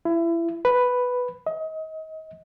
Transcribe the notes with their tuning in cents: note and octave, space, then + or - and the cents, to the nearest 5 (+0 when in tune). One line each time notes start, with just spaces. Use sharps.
E4 +25
B4 +5
D#5 +30